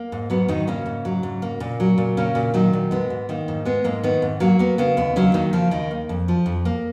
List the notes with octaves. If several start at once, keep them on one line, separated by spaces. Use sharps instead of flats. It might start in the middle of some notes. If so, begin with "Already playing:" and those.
Already playing: A#3
G#2
F#3 B3
G#2 D#3 D#4
C#3 A#3 C#4
G#2
F#3
G#2
A#3
A#2
F#3
A#2
C#3 A#3 C#4
A#2
D#3 F#3 D#4
A#2
G#3 B3
G#2
D#3 A#3
G#2
G#3 B3
G#2 A#3
D#3 B3
G#2
F#3 A#3
A#3 B3
C#3 B3
D#2 B3
C#3 F#3 C#4
D#3 A#3 D#4
C#3 F3 F4
D#2 D#3 D#4
A#3
F2
F3
F2
A#3